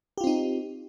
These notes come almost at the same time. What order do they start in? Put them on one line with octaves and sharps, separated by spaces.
G4 F4 C4 D#4